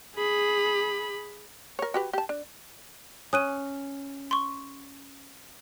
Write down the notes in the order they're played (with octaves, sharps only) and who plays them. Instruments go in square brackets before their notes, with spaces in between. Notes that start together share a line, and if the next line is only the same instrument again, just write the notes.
[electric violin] G#4 B5
[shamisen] A#4 C#5
F#4 G4 B4
G4 A5
D4
[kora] C#4 [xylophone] D#6 F#6 D#7
[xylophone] C6 C#6